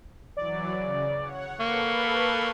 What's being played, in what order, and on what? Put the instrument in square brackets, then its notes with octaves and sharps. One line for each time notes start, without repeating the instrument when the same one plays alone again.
[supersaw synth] E3 F#3 [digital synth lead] D5
[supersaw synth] C#3
C#5 F#5
[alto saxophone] A#3 [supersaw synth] A4 B4 [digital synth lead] C#6